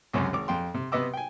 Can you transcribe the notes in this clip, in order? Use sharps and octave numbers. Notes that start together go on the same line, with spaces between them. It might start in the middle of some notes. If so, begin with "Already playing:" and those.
C#2 F#2 C3 C#4
G#1 D6
F2 G5 C6
C3
C3 B3 B4 D#5 D6 E6
G5 G#5